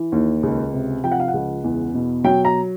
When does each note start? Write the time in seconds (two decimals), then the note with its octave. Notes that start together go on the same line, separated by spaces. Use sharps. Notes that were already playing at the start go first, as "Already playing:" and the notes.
Already playing: E3
0.12 D#2
0.43 C#2
0.73 C3
1.04 F3 G5
1.12 F#5
1.20 F5
1.28 F#5
1.34 C#2
1.64 E2
1.94 B2
2.24 F#3 G5
2.45 A#5